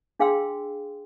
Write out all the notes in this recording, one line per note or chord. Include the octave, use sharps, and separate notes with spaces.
D4 G#4 F5 G5 C6 E6